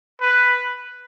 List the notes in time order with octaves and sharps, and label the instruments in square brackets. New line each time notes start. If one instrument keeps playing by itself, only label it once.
[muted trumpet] B4